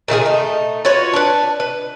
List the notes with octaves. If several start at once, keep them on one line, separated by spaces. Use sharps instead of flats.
A#2 D#3 F4 G#4
A3 D#4
F4 F#4 B4 C#5
D4 B4
B4